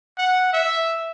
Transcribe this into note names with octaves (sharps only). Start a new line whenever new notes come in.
F#5
E5